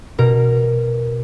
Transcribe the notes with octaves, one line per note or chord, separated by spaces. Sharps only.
B2 A#4